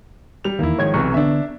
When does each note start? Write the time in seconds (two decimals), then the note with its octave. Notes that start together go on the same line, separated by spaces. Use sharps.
0.44 G3 F7
0.59 E2 D#3 A#3 E4
0.79 G#2 D#3 F3 C#5 G#6
0.94 B1 C3 E3 C#6
1.14 D3 B3 D4 E5